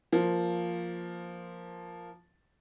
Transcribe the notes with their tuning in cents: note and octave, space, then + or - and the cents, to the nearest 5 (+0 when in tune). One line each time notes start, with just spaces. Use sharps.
F3 +0 A#3 +0